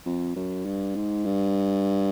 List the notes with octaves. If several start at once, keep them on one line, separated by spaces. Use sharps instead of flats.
F2
F#2
G2
G#2
G2